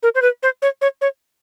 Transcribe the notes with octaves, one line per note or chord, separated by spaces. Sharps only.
A#4
C5
B4
C5
C#5
C#5
C#5